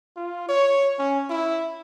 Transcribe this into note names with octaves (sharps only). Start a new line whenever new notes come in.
F4
C#5
C#4
E4